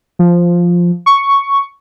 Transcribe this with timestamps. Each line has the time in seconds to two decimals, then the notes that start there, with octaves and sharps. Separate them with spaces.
0.19 F3
1.06 C#6